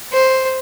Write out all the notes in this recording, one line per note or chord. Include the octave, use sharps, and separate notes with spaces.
C5